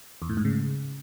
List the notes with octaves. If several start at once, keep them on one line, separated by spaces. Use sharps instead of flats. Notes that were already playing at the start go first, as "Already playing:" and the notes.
E2
A2
G#2
C#3